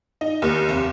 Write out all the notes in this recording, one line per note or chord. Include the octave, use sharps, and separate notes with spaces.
D#4
D#2
F1